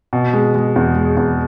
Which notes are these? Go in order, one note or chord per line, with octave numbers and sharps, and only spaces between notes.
B2
G#3
G#3
E2
G#3
E2